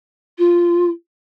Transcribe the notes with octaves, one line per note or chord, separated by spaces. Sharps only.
F4